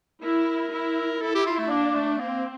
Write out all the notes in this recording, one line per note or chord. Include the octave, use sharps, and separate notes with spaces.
E4 A#4
E4
E4 A4
G4
F4
A3
A#3 D4
A3
A#3 C4